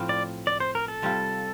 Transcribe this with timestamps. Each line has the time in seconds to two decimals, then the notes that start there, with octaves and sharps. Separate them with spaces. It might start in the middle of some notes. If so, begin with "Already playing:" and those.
Already playing: A2 F3 C4 F4
0.09 D5
0.47 D5
0.60 C5
0.75 A#4
0.88 A4
1.02 C3 G3 C4 F4